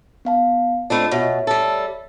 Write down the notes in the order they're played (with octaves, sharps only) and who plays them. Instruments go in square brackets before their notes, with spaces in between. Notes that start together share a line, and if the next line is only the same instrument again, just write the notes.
[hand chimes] B3 F5 A5
[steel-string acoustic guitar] A3 C4 D4 [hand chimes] F4 D#5 B5
[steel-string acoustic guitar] B2 [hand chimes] C#5 E5
[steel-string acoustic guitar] G3 A4